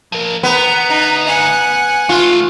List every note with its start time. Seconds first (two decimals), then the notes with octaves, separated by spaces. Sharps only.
0.12 F3 A#4
0.43 D2 B3 A#5
0.89 D#4
1.26 F#5 G#5
2.09 E3 A3 F4